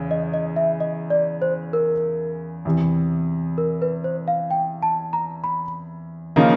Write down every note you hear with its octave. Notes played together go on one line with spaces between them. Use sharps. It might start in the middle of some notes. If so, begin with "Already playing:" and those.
Already playing: E2 C#3
D#5
D#5
E5
D#5
D5
C5
A#4
E2 C3 E3
A#4
B4
C5
F5
G5
A5
A#5
B5
C#3 F3 A#3 D#4